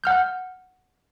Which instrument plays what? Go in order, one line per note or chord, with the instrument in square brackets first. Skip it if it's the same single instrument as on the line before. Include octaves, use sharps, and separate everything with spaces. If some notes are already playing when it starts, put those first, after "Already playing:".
[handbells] F#5 F6 G6